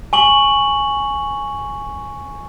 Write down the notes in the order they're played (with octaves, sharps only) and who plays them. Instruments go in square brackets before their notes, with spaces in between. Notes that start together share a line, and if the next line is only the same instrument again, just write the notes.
[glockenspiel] G#5 C#6 F#7